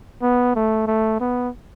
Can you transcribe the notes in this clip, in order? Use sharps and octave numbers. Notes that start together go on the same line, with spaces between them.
B3
A3
A3
B3